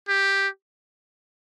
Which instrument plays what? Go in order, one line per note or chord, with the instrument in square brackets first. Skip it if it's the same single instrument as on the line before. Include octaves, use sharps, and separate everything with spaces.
[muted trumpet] G4